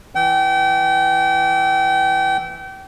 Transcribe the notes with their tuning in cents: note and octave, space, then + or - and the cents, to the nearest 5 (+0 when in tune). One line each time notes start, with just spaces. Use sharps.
E3 +0 G5 -35